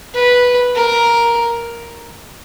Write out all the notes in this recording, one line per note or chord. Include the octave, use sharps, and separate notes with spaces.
B4
A#4